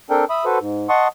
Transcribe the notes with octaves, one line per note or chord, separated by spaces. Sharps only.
C4 D4 A4 A#4 G5
E5 B5 D#6
F#4 A4 B4 C5
G#2
D#5 F#5 A5 C6 C#6 D#6